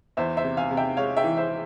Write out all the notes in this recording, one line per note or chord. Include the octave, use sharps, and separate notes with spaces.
E2 C5 E5
C5 E5
C3
F5 G#5
C3
E5 G5
G#3 C#5 F5
E5 G5
E3
C5 E5